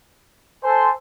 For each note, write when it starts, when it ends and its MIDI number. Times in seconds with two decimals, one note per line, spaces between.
0.63 0.88 69
0.63 0.88 72
0.63 0.90 80